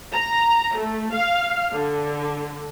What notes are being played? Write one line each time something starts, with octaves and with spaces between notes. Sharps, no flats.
A#5
A3
F5
D3